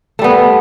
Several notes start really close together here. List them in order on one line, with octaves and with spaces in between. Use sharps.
A3 G3 B3